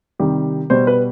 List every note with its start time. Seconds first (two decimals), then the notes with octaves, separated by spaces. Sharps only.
0.19 C3 D#3 G3 G4
0.70 B2 G3 C5
0.87 B4